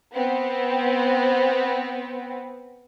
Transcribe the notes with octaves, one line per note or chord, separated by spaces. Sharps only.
B3 C4